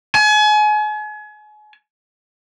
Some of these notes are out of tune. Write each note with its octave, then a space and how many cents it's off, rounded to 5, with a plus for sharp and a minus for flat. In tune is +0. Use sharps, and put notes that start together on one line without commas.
G#5 +35